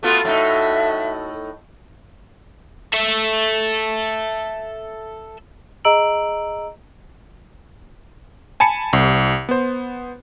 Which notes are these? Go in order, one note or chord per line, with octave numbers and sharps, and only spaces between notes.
A3 B3 F4 F#4 A4
A2 D#4 E5
A4 E5
G#4 D#5 A#5 E6 D7 F#7
G#5 A5 B5 C#7
C2
B3 C5